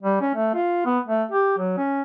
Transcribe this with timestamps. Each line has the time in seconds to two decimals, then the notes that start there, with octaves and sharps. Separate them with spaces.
0.03 G3
0.21 C#4
0.35 A3
0.55 F4
0.86 B3
1.07 A3
1.31 G4
1.58 F#3
1.78 C#4